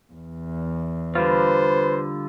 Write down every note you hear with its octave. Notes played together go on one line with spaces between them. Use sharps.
E2
D3 G3 F4 B4 C5